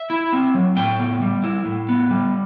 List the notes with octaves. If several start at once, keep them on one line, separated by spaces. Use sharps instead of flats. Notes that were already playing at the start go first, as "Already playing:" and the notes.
Already playing: E5
E4
C4
F#3
A2 G5
B3
G3
E4
A2
B3
G3